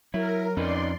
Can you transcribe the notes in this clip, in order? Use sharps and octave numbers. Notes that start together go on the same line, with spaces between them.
F#3 E4 A#4
F2 C#4 D#4 B4 D5 C6